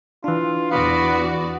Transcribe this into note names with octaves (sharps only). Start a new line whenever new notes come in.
E3 D4 F4
E2 B3 F#4 D5